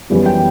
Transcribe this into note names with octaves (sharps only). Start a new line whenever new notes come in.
F#2 E3 G3 B3
G5